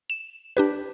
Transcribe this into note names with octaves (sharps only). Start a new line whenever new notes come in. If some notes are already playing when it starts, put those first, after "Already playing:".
E7
D4 G4 B4